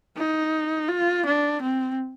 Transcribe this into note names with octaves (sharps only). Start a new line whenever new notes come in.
D#4
F4
D4
C4